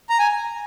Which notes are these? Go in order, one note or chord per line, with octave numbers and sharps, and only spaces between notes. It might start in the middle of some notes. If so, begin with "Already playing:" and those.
A#5
G#5